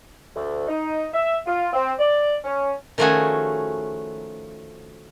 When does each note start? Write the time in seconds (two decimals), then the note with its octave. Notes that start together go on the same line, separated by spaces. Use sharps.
0.35 D2
0.67 D#4
1.13 E5
1.46 F4
1.73 C4
1.99 D5
2.44 C#4
2.98 D#3 F3 A3 C#4 F#4 G#4